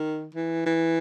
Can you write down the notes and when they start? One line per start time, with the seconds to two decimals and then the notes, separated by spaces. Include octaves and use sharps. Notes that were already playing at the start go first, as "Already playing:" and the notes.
Already playing: D#3
0.34 E3
0.66 E3